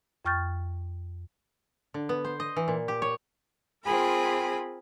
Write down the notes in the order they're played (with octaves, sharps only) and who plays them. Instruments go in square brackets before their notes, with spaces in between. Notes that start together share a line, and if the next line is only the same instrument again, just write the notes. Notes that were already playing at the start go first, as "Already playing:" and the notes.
[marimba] F2 G5 C#6 F6 G6 A6
[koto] D3
B3
C5
D#5
E3
A#2
G4
C#5
[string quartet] C4 F4 G#4 A#4 G#5 B5